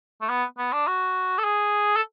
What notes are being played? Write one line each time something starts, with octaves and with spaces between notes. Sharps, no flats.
A3
B3
B3
D4
F#4
A4
G#4
A4